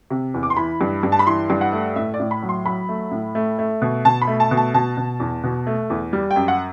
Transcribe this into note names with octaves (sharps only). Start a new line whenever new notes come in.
C3
E2
D6
C6
E3 B5
G2
G2
A5
B5
E3 C6
G2
F#5
A3
A2 E5
D5
A2
B5
F#3
C6
F#3 B5
A3
A2
A3
A3
B2
B2 A5
B5
A3
A5
B2
A5
B2 A5
B2
E2
B2
A3
E2
G3
G5
F#2
F#5